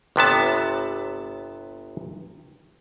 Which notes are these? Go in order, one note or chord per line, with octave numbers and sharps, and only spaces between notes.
G1 C3 B3 A5